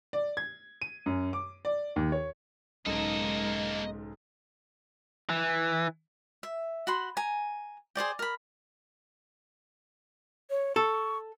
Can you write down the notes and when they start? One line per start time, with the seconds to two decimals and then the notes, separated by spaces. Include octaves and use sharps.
0.13 D5
0.37 G#6
0.82 D#7
1.06 F#2
1.33 D6
1.65 D5
1.96 D#2
2.12 C#5
2.87 B1 G#2 C#3 G#3 A#3 A4 A#4 D#5
5.29 E3
6.43 E5
6.87 F#4 B5 C6
7.17 G#5 A#5
7.95 G#4 C5 D5 G5
8.19 A#4 B5
10.50 C#5
10.76 A4 C#6